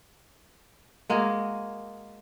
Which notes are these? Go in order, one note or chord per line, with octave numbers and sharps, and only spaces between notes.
G#3 A#3 F#4 G#4